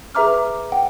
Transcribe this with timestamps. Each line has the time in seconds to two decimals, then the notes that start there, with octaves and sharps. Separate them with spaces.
0.15 G#4 B4 E5 A#5 D6 F6
0.72 F#5 G5